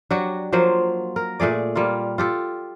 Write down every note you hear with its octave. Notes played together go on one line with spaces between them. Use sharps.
F#3 D4 F#4 G4
F3 F#3 A#3 C5
A#4
A#2 A3 G#4 D5
G3 A#3 F4
F4 G4 A4